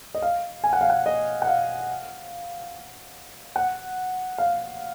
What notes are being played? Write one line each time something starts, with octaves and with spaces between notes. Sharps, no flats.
D#5
F5
G#5
F#5
F5
F#5
D#5
F#5
F5
F#5
F5